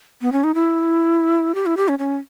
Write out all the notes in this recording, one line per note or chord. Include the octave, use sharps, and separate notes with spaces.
B3
C#4
D#4
E4
G4
E4
G4
C#4
C#4